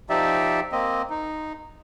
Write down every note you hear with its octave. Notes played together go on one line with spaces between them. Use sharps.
F3 D#4 G4 D5 E5
A#3 C4 D#5
D#4